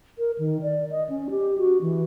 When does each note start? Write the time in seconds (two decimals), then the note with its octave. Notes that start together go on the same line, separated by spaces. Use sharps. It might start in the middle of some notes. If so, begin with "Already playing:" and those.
0.18 A#4
0.38 D#3
0.62 D5
0.91 D#5
1.09 C#4
1.30 G4
1.58 F#4
1.82 E3